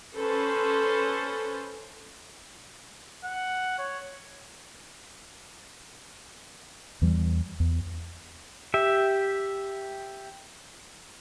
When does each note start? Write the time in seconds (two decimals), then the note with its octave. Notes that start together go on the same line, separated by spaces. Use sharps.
0.16 C#4 A4 B4 C5
3.25 F#5
3.78 C#5
7.02 E2 E3 G3
7.60 E2
8.74 G4 E5